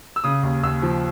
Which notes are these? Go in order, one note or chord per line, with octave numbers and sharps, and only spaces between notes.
E6
C#3 D#6
D#2
D#2 E6
F3